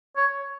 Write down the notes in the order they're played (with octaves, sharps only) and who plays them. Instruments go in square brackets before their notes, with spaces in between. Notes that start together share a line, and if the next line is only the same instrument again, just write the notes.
[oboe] C#5